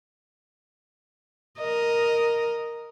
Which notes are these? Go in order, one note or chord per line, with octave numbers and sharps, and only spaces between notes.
A#4 D#5